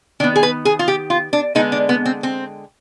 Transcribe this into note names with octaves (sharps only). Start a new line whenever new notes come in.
D#3 B3 D4
G#4
B4
G#4
F4
G4
F4
D4
D3 G#3 B3 D#4
D4
B3
C4
C4